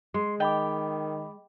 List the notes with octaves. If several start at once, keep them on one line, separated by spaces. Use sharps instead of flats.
G#3 C6
D#3 D#5 G5 B5 D6